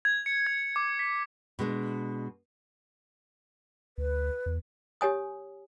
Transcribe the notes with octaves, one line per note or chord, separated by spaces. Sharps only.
G#6
C#7
G#6
D6
B6
B2 G#3 D4
D2 B4
E2
G4 C#5 G#5 D#6